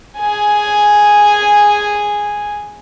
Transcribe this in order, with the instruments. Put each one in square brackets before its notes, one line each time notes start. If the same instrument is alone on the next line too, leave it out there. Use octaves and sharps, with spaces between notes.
[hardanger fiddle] G#4 G#5